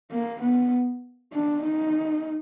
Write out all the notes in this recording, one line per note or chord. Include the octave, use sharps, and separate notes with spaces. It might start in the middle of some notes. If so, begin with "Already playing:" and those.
A#3
B3
D4
D#4